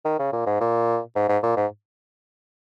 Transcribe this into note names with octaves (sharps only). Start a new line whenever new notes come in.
D#3
C#3
A#2
G#2
A#2
G#2
G#2
A#2
G#2